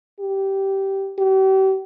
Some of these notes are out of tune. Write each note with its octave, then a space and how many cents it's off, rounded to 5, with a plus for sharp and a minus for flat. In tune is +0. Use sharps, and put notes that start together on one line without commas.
G4 -10
G4 -40